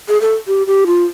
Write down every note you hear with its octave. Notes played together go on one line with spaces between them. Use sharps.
G#4
A4
G4
G4
F4